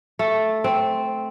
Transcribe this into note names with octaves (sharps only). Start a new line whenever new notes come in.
A3
C4